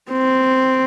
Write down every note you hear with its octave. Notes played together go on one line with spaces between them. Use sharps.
C4